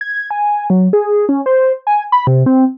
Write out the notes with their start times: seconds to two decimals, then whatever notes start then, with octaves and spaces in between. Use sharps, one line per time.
0.01 G#6
0.31 G#5
0.70 F#3
0.93 G#4
1.29 C#4
1.46 C5
1.87 G#5
2.12 B5
2.27 C3
2.46 C4